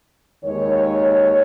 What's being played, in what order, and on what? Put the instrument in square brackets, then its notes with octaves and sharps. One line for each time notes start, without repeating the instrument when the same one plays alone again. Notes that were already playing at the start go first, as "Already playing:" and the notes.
[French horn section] D#2 D#3 G#3 C#5